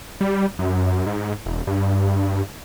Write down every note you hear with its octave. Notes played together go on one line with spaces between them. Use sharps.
G3
F#2
G#2
E1
G2